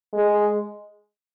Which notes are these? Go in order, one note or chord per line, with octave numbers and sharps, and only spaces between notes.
G#3